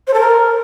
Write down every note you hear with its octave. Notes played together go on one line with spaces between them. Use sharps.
C5
A4
A#4